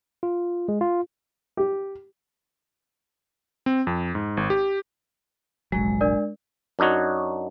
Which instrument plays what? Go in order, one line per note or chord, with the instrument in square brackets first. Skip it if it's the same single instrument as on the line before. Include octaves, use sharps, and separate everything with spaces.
[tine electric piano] F4
G#3
F4
[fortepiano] G4
[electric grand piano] C4
F2
G#2
G#1
G4
[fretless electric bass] F1 A#1 F#3 [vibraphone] G#3
[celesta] D4 A#4 D5
[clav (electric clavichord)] F#2 D4 D#4 F#4 C#5